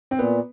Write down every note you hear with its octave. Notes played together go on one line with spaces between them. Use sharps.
C4
A#2 B3